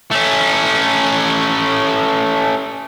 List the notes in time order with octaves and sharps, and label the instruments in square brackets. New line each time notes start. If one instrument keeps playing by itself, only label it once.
[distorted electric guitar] A3 C#4